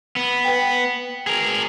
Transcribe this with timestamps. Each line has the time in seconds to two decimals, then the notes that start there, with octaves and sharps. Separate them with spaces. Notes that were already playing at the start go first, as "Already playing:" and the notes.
0.16 B3
0.45 B4 G5
1.27 G#4 A#4